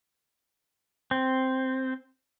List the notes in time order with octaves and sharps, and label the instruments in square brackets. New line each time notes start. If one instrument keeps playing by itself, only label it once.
[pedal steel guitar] C4